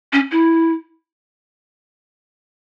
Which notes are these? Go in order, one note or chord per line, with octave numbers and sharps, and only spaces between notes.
C#4
E4